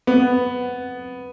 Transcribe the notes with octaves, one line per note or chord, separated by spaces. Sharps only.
B3